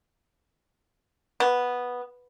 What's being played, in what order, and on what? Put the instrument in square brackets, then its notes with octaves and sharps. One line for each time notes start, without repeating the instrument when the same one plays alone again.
[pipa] B3